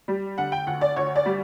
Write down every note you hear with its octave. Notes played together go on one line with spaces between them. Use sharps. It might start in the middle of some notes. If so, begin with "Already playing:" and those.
G3
D3 F#5
G5
D2 F#5
D5
D2 C#5
D5
G3